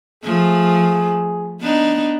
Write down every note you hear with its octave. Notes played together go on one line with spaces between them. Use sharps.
F3 A3 G#4
B3 D4 D#4